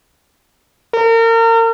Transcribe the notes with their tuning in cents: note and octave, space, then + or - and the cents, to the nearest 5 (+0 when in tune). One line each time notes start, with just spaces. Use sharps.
A#4 -35